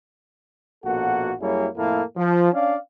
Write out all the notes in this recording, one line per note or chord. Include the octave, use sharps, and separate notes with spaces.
A#1 B2 A#3 F#4 A4 F#5
F#2 G3 A#3 E4 G#4 C#5
F2 A2 A#3 E4 A4 F5
F3
C#4 D4 D5 F5